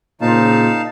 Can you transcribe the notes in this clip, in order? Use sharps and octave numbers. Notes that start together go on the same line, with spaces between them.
A#2 C#3 D#4 C5 F5 A5